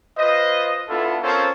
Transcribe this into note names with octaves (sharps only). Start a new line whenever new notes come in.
F4 B4 C5 D#5
B3 D4 E4 F4 A4
C4 C#4 F4 A4 A#4 C5